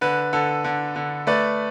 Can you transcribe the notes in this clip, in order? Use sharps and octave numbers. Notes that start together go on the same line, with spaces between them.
D3 B4
D3 A4
D3
D3
A3 B4 D5